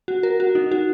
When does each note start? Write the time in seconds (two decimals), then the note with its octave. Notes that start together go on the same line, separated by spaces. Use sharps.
0.08 F#4
0.23 A#4
0.40 F#4
0.55 D#4
0.72 F#4